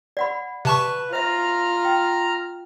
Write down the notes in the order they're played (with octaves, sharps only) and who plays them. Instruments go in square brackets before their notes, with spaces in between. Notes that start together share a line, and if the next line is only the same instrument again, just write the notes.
[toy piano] D5 F#5 B5
[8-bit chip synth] C3 A5 C#6 [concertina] B4
[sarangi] F4 [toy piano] C5 E5 [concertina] A#5 F6
[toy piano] G5